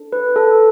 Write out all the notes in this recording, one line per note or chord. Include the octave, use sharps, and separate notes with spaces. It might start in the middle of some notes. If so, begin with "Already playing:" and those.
Already playing: D4 A4
B4
A4